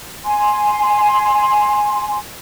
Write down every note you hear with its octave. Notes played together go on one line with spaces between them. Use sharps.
G#5 C6